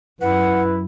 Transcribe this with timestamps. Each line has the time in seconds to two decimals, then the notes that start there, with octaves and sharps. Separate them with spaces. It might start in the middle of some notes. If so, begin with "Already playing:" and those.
0.21 F#2 E4 B4 F#5